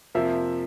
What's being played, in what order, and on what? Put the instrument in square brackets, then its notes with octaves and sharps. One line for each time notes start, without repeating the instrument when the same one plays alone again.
[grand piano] F2 C3 F3 A#3 E5